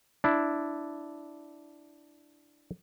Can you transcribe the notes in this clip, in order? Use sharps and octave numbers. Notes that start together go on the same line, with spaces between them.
D4 E4